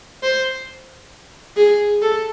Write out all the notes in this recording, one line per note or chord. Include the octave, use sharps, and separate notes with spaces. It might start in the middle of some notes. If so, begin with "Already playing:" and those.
C5
G#4
A4